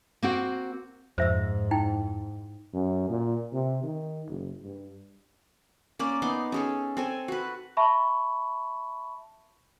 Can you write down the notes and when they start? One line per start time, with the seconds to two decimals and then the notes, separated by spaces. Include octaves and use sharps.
0.23 A#3 C4 F#4
1.18 F2 G#2 C5 E5 E6
1.71 D#4 E4 G5
2.73 F#2
3.09 A#2
3.53 C3
3.83 D#3
4.28 F#1
4.63 G2
5.99 A#3 C#4 D5
6.22 B3 D#4 C6 D6
6.52 C#4 G#4 A4
6.97 C4 A4 G#5
7.28 F#4 B4
7.77 E5 A5 B5 C#6